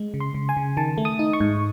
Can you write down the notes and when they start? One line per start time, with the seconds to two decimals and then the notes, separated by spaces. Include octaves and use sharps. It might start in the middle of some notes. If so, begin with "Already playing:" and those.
Already playing: G#3
0.14 C#3
0.20 C6
0.34 C#3
0.49 G#5
0.57 C#3
0.77 D#3 A5
0.98 A3
1.05 D#6
1.19 D#4
1.33 C#6
1.40 G#2